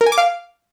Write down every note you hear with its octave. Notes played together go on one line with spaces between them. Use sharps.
A#4
G#5
D6
F5